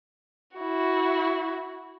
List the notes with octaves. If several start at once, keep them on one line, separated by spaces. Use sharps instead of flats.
E4 F#4